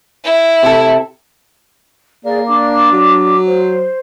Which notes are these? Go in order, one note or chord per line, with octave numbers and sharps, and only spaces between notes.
E4
C3 A4
A#3 G#4 D5
D4 D6
F#3
C5